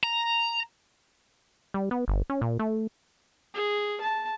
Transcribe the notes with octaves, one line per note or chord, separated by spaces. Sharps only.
A#5
G3
B3
G1
C#4
A#2
A3
G#4
A5